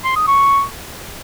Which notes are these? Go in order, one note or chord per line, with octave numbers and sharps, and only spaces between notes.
C6
D#6
C#6